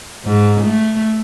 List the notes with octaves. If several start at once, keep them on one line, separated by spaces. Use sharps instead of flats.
G#2
A3